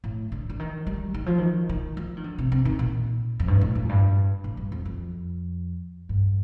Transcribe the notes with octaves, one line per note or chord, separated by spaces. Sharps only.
A2
D3
D3
D#3
G3
D#3
F3
D#3
D#3
F3
D#3
D3
C3
C3
D#3
A#2
F2
G2
A2
A2
F2
G2
A2
G2
F2
F2
G2